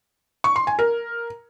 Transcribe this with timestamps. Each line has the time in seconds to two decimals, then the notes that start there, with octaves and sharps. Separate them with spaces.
0.44 C#6
0.56 C6
0.67 G#5
0.79 A#4